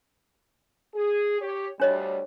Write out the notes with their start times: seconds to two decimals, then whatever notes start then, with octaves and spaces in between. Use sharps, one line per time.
0.95 G#4
1.41 G4 C#5
1.80 D2 G3 D4 C#5 D#5